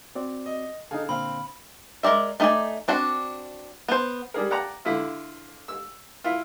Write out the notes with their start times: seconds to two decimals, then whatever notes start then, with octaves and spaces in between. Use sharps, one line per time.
0.15 C4 F#4 D5
0.46 D#5
0.91 D3 D#4 G#4 A4 F5
1.09 A#2 D3 C4 F5 B5
2.03 G#3 A#4 D5 E5
2.40 A3 D#4 F#4 D5 G#5
2.88 C4 D4 F#4
3.88 B3 C5
4.34 G3 D4 G#4 A#4
4.51 D5 F#5 G5 A5 A#5
4.85 D3 E4 F4
5.68 E6
6.24 E4 F4